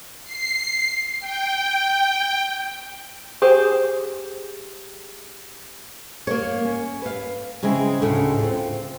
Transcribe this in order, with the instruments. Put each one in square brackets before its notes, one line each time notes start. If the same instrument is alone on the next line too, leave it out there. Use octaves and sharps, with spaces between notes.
[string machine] C7
G5
[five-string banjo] G4 G#4 C5
[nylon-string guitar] A#3 C#5
C#4
B4 F5
C#3 G#3 C4 E4 G#4
D2 A2 C#3
C4 F4